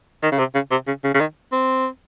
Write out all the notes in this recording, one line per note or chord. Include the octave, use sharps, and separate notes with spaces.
D#3
C#3
C3
C#3
C3
C#3
C#3
C#3
D#3
C4